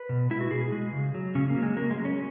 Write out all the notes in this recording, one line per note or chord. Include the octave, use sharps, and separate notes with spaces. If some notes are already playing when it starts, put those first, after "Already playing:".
Already playing: B4
B2
G#3 E4
F#4
B2 G#4
G#3
C#3
F#3
C#3 C#4
A#3
F#3
G#3
C#3 A#3
G#3
F#3
C#4